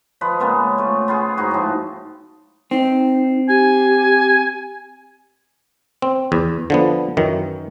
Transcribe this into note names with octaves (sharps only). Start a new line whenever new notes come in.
F3 B4 D#5
C#3 G#3 A#3 B3
A3 F4
B3 F4 G#4
G#2 D#4 F#4
A2 F3
C4 D#4
G4 G#5
C4
E2
D3 F3 B3
F#2 D#3 E3